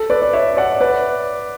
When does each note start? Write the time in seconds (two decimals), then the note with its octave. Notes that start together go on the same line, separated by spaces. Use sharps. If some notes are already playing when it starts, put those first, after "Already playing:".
Already playing: A4
0.10 B4 D5
0.22 D5
0.33 C#5 E5
0.51 E5
0.57 D5 F#5
0.80 B4 D5